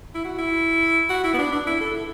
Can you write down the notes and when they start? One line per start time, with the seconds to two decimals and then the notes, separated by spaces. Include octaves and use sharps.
0.15 E4
0.25 F#4
0.38 E4
1.10 F#4
1.24 E4
1.34 B3
1.39 D4
1.52 D4
1.67 E4
1.81 A4
1.94 E4